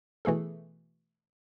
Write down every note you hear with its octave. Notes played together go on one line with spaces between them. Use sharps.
B2 E3 A3 G#4 A4